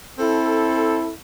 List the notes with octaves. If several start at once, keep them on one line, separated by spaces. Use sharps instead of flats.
C4 E4 A4